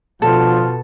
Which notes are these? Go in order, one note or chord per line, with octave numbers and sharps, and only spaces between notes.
D2 B2 D3 F3 F4 A4